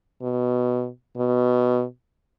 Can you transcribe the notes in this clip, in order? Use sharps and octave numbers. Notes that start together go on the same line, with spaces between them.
B2
B2